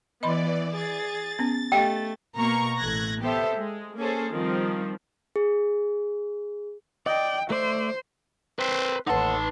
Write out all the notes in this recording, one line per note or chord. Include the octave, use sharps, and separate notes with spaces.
E3 B3 D5 D#5 B5 C6
G#4 A6
B3 C#4
A3 G4 D#5 F5 G5
B2 A#3 A#5 C#6
A1 A3 F#6 G#6 A#6
B3 G4 A4 C5 E5
G#3
A#3 C#4 G#4 A4 C5
D#3 F3 G3 C4
G#4
D5 D#5 G5
A3 C5 D5 E5
C4 B4 C5
A1 D#2 D#4 A4 B4 F#5 A5 C6